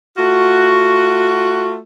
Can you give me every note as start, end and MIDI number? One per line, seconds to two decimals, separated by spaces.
0.18 1.78 57
0.18 1.78 65
0.18 1.78 66